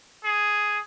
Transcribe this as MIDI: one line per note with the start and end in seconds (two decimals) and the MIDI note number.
0.25 0.79 68